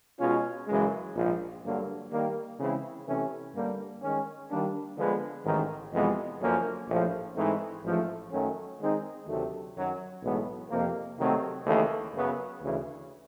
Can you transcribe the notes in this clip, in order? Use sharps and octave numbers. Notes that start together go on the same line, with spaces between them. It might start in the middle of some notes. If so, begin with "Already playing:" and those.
B2 G#3 C#4 F4
F#2 C#3 E3 G#3
A#1 G#2 F3
G2 D3 F#3 A#3
D#3 G3 A#3
C#3 E3 G#3 C4 E4
C3 E3 A3 C#4
G2 D3 G3 A#3
D#3 G#3 C#4
D#3 G3 A#3 D4
D3 F3 G#3 B3
A1 G#2 D#3
F2 C3 E3 G#3 B3
F#2 D3 F3 A#3 C#4
A#1 A2 F3 A3
G#2 E3 A3 C4 D#4
A1 G#2 F3 A3
F#2 D#3 F#3 A3 C#4
D#3 G#3 C4 D#4
D2 C3 D#3 F#3 A3
F#2 D#3 F#3
B1 A2 E3 G#3 B3
F2 C3 F3 A#3
C3 D#3 F#3 A3 C4
D#2 C#3 E3 A3
F#2 C#3 F#3 B3
D2 C#3 E3